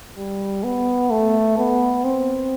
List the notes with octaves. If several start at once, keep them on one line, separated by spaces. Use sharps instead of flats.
G3
B3
A3
B3
C4